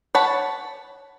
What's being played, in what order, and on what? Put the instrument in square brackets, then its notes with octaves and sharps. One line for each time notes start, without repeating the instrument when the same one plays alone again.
[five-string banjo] C#5 F#5 A5 B5